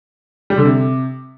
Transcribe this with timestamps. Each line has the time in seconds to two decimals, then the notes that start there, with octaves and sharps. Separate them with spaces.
0.50 G3
0.58 D3
0.65 C3